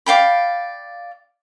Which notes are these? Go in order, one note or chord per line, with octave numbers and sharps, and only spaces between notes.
D5 F5 G5 B5